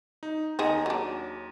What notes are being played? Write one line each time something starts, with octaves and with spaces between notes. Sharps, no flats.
D#4
D#2 D#4 G#4 C5 A#5
F#3 D4